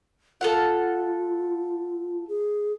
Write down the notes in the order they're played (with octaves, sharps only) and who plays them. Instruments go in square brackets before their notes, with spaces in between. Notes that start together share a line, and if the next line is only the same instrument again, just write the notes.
[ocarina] F4 [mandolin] A4 F5 F#5
[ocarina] G#4